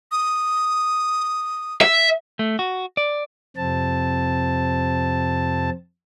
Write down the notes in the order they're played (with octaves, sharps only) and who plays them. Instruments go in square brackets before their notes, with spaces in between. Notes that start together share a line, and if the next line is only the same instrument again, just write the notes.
[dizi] D#6
[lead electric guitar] E5
[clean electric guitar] A3
F#4
D5
[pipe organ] F2 C3 C4 A5